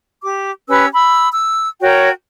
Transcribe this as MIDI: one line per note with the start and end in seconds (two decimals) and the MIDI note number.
0.22 0.50 67
0.22 0.50 86
0.69 0.86 61
0.69 0.86 67
0.69 0.86 71
0.69 0.86 88
0.93 1.27 83
0.93 1.27 88
1.31 1.67 88
1.81 2.10 66
1.81 2.10 70
1.81 2.10 73
1.81 2.10 79